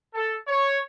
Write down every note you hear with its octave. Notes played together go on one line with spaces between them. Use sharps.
A4
C#5